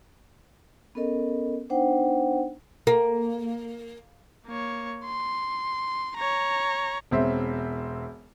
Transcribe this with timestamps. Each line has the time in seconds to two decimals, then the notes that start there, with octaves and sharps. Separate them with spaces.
0.95 B3 C#4 A4 A#4 D#5
1.70 B3 D4 D#4 C5 F#5 G5
2.87 A#3
4.47 A#3 C#5
5.05 C6
6.17 C#5 A#5
7.11 E1 C4 E5